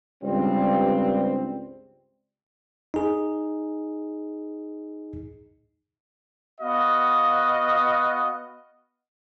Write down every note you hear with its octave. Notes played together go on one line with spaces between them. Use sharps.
C#2 G2 G3 C4
D#4 G#4
B3 F#4 D#5 F5